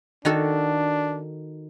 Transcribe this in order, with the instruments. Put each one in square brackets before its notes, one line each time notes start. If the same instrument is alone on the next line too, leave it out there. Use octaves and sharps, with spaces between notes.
[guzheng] D#3 F#4 A4 [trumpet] D4